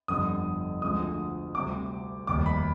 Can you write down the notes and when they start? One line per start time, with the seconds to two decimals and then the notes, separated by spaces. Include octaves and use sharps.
0.08 G1 F2 D3 G3 D#6
0.82 D2 D3 F3 G#3 D#6
1.55 D2 C3 G3 D6
2.27 F1 D#2 D#3 G3 D6
2.46 B5